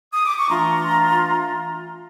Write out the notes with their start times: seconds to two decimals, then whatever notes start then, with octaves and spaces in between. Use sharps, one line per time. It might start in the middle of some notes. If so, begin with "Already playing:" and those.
0.13 D#6
0.26 D6
0.38 C#6
0.49 E3 A3 D4 F4 A#5 C6